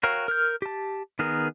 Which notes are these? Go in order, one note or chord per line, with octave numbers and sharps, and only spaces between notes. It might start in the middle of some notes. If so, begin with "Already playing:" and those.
F#4 A#4 C#5 F5 G5
A#4 F6 G6
G4 A5
D#3 B3 G#4 A#4